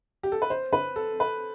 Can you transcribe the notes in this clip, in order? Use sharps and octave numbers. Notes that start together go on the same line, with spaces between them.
G4
A4
B4
C5
B4
A4
B4